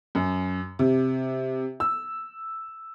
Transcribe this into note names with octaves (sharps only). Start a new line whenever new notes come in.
F#2
C3
E6